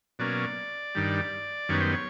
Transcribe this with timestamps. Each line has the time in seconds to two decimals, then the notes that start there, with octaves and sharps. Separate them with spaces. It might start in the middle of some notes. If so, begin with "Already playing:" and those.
0.19 B2 F#3 A#3 C#4 D5
0.95 G2 D#3 G3
1.69 F#2 D#3 G3 B3 C#5
1.80 C5
1.92 C#5